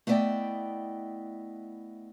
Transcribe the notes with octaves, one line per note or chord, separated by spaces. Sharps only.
A3 B3 E4 D5 D#5 G5